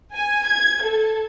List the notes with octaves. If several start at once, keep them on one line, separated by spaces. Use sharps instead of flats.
G#5
G#6
A4